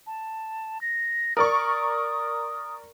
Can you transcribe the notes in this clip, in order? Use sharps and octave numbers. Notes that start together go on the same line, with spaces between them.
A5
A#6
A#4 D5 C#6 D#6